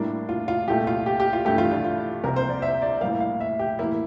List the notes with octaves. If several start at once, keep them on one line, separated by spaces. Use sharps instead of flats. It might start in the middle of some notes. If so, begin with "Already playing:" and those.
Already playing: A2 G3 A#3 D4
F4
F4
C2 A#2 A3 G4
F4
G4
G4
F4
G2 E3 A3 G4
F4
D4
F4
C2 C3 F3 A#3 A#4
C5
D5
E5
D5
A2 G3 A#3 F5
F5
E5
G4
A2 E3 A#3 E4